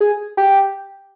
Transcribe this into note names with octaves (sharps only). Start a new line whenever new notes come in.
G#4
G4